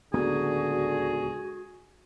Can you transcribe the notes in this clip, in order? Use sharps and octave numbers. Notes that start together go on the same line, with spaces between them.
D1 C#2 D3 B3 F#4 G#4